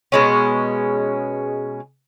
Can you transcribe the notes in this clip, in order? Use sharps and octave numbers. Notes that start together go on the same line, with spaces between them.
B2 G#3 C#4